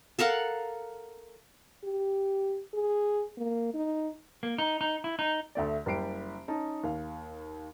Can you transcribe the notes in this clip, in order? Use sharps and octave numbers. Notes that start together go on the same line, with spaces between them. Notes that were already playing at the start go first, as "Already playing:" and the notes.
A4 A#4 F5 F#5
G4
G#4
A#3
D#4
A#3
D#4
D#4
E4
D#4
D2 A3 D5
F#1 G3 G4 C7 D7
C#4 D#4 A5
D#2 F5